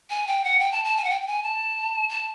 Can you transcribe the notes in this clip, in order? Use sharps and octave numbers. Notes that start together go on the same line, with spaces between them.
G#5
G5
F#5
G5
A5
A5
G#5
F#5
G5
G5
G#5
A5
A5